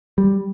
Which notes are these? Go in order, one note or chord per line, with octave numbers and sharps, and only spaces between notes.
G3